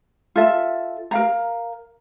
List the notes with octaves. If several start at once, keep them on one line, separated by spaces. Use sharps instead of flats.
F4 A4 E5
A#4 F5 A#5